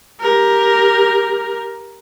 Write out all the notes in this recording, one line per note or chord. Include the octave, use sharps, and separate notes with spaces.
G4 A#4